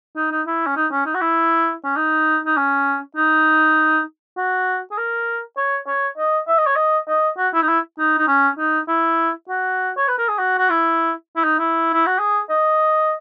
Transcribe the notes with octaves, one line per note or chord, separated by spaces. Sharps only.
D#4
D#4
E4
C#4
D#4
C#4
D#4
F#4
E4
C#4
D#4
D#4
C#4
D#4
F#4
G#4
A#4
C#5
C#5
D#5
E5
D#5
C#5
D#5
D#5
F#4
E4
D#4
E4
D#4
D#4
C#4
D#4
E4
F#4
C#5
B4
A#4
G#4
F#4
F#4
E4
E4
D#4
E4
E4
F#4
G#4
D#5